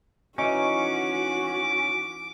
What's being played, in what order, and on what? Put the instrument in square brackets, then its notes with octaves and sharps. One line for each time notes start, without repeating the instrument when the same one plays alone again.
[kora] E3 D#4 [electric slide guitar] C#4 [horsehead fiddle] F#4 [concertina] D6